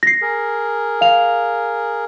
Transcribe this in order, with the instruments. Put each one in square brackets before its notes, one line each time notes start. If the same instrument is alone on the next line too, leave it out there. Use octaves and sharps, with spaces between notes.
[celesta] A#6 C7
[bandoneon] G#4 A#4
[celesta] F5 F7